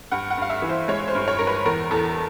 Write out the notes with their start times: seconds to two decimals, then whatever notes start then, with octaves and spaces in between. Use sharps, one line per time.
0.12 G2 F#5
0.30 F#5
0.37 G2 F5
0.50 E5
0.62 E3
0.69 C5
0.88 G#3 C#5
1.08 C5
1.15 G2
1.28 C#5
1.39 G2 A#4
1.47 B4
1.65 E2 A#4
1.91 E2 A4